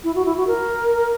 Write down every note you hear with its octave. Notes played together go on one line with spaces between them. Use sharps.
E4
F#4
E4
F#4
A#4